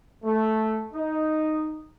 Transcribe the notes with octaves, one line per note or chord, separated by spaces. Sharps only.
A3
D#4